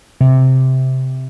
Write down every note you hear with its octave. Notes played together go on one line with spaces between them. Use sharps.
C3